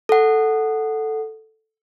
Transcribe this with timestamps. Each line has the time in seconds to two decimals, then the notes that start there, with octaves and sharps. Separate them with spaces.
0.09 A4 F#5